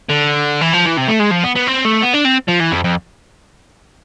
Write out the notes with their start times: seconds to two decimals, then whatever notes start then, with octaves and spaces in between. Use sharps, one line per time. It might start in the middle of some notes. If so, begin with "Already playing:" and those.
0.10 D3
0.61 E3
0.73 F3
0.86 E3
0.97 C3
1.08 A3
1.20 G#3
1.31 F3
1.44 B3
1.56 B3
1.68 C4
1.85 A3
2.03 B3
2.14 D4
2.25 C4
2.48 F3
2.60 E3
2.72 F2
2.84 F2